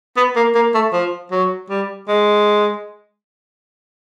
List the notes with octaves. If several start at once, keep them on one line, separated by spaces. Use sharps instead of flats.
B3
A#3
A#3
A3
F3
F#3
G3
G#3